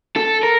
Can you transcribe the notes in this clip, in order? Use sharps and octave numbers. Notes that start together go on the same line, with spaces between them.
A4
A#4